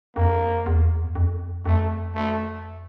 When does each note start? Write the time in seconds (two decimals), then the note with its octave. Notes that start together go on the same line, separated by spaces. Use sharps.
0.16 F2 A#3
0.66 E2
1.04 F#2
1.15 F2
1.65 F2 A3
2.15 A3